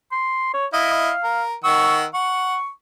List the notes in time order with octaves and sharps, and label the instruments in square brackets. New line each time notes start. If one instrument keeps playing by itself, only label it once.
[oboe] C6
C#5
[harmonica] E4 D#5 [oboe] F5
[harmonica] A#4
[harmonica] D#3 F#5 E6 [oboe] C#6
[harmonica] F#5 [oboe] C#6